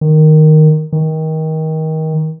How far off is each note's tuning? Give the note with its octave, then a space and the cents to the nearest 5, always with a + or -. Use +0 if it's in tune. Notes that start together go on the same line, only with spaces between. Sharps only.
D#3 -5
D#3 +25